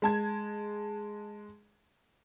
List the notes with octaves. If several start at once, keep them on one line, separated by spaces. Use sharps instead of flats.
G#3 A5 G#6